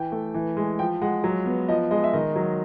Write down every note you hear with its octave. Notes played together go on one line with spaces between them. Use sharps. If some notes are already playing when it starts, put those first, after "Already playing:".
Already playing: E3 G5
A3
E3
G#3
F3 G5
G#3 F#5
F#3
B3
F3 D#5
G#3 D#5
E5
D#3 D#5
F#3